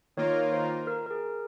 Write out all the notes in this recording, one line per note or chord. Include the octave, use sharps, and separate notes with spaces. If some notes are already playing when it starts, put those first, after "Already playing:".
D#3 A#3 F4 A#4 C#5
C5
A#4
A#4
G#4